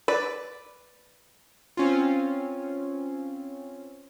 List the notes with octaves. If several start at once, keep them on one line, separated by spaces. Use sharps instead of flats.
B4 D5
C4 C#4 F4